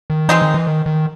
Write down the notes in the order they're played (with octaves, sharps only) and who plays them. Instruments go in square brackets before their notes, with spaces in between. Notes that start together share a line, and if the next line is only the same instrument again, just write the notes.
[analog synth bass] D#3
[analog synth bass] E3 [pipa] G#3 C4 D#4
[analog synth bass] D#3
E3
D#3
D#3